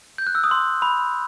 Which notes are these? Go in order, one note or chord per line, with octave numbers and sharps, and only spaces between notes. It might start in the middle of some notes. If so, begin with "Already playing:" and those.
G6
F#6
E6
D#6
C6
B5